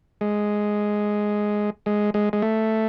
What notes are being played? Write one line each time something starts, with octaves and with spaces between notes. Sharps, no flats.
G#3
G#3
G#3
G#3
A3